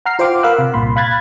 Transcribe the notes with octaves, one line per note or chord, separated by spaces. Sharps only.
F#5 A#5 F6 C7
F4 C5 F5 G5 D6
A#4 F5 F#5 B5 E6 F#6
C3
C2 G2 A#2 B5 C6
F5 B5 F#6 G#6 A6